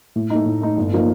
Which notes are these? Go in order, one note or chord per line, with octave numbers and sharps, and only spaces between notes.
A2
A3 D#4
A2
A3 D#4
G1
F3 A#3 D#4